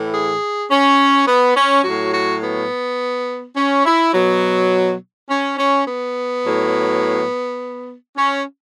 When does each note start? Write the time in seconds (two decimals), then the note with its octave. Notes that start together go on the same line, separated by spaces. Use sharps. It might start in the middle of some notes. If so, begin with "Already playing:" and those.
Already playing: A2 E3
0.11 G#4
0.69 C#4
1.26 B3
1.54 C#4
1.83 A2 F#3 F#4
2.12 F#4
2.41 B3
3.56 C#4
3.85 E4
4.13 B2 F#3
5.28 C#4
5.56 C#4
5.85 B3
6.44 A2 F#3
8.15 C#4